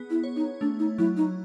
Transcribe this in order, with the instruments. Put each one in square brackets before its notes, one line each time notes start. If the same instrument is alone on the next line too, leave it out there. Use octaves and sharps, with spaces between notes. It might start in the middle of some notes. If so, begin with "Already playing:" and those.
Already playing: [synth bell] B3 G#4
[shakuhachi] E4
[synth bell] C#5
[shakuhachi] D#4
[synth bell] A3 [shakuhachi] D4
[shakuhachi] D#4
[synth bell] F#3 [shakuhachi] E4
[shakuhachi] D#4